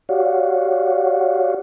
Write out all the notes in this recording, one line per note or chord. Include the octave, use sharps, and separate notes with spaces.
F#4 G4 C#5 D5 F5 F#5